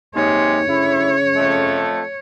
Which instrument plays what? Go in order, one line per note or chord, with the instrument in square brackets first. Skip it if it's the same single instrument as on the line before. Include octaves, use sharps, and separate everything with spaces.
[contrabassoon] D#2 [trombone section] C3 G#3 [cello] C#5
[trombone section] D2 E4 [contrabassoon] C#3
[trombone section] F2 A3